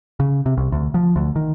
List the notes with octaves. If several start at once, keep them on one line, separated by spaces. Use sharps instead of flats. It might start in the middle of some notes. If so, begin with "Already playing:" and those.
C#3
C3
C2
D2
F3
D2
D#3